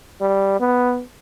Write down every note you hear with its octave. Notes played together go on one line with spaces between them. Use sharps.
G3
B3